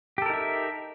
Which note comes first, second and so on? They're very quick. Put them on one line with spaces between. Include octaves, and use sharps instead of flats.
G4 A4 A#4 D#4 E5